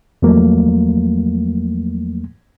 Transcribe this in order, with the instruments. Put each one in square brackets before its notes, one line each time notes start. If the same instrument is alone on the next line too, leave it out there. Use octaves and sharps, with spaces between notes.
[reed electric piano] E2 F3 F#3 A3 A#3